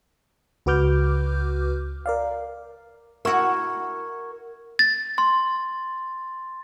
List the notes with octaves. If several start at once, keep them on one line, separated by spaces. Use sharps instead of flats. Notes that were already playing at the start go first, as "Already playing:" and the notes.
C#2 F#4 B4 D6 F6 G6
A#4 D5 F5
E4 F#4 A#4 C#6 G#6
A6
C6